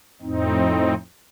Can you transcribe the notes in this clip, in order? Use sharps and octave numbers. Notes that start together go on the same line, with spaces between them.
F2 A2 C4 D#4